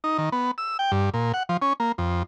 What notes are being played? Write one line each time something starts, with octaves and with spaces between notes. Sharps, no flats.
D#4
D#3
B3
E6
G5
G2
A#2
F#5
F3
C#4
A#3
F2